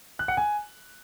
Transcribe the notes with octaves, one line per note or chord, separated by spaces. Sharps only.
F#6
F#5
G#5